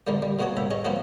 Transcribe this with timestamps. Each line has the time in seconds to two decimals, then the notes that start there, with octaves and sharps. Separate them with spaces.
0.07 E2 A#2 D3 G#3 A#3
0.22 G3
0.39 B2 A#3 F#4 G#4 C#5 A5
0.57 C2 C3 E5
0.71 C#4 G#4 D#5
0.85 E3 F3 A#3 C4 C#4 F#4